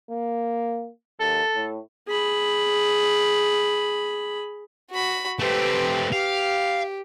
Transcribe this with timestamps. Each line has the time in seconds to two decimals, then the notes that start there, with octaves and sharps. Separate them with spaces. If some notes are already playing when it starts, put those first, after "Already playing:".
0.10 A#3
1.20 D#2 A4
1.55 A2
2.08 G#4 B5
4.91 F#4 B5
5.39 A3 C4 G4 B4
6.12 G4 F5